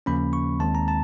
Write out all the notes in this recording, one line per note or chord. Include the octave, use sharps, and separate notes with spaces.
D#2 C#3 F3 A#3 C#4 B5
C#6
D#2 D#3 G#3 C4 A5
A#5
A5